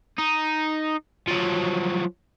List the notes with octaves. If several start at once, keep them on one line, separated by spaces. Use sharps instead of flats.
D#4
F3 F#3